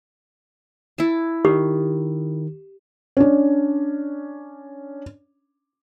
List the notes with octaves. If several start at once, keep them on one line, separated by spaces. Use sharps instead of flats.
E4 A5
D#3 G4
C#4 D4